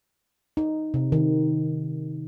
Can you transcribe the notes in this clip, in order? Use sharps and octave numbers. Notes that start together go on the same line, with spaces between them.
D#4
C3
D#3